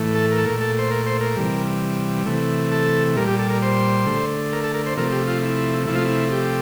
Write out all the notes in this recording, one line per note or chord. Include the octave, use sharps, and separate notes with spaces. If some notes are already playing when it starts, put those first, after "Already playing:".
Already playing: A2 E3 A3
A4
A#4
A4
A#2 A3 A#4
A4
C5
A#4
C5
A#4
C3 E3 G3
C3 E3 A3
A4
A#2 G3 A#4
G4
A4
A#4
C5
D3 A3
A#4
A4
A#4
C5
C3 F3 A3 A#4
G4
F4
E4
C3 F3 A3 E4
F4
E4
G4